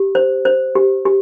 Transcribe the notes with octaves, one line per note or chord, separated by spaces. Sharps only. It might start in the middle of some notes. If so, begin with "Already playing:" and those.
Already playing: G4
C5
C5
G4
G4